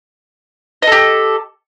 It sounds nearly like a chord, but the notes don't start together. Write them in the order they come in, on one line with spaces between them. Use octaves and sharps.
D#5 A4 G4